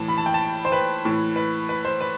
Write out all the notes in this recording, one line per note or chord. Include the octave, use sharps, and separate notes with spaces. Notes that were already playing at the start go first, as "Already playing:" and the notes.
Already playing: A2 E3 A5
B5
A5
G5
A5
C5
B4
A2 E3
B4
B4
C5
B4